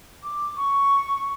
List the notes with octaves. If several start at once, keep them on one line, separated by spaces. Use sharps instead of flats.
D6
C#6